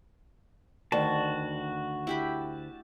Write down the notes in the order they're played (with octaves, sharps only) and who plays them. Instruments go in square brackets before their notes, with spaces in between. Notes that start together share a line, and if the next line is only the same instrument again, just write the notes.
[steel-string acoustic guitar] D2 [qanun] D#3 [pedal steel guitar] F#4 A5
[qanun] E4 G4 B5